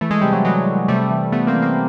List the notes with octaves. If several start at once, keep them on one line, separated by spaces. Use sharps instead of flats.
E3 A3
G#3
C3 G3
F#3 G#3
E3 F#3 G#3
E3
C3 G3 A3
E3
C3 A3 B3
A#3 C4
E3
A#3 C4